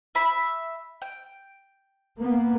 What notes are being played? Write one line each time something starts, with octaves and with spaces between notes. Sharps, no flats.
E5 B5
G5
A#3 B3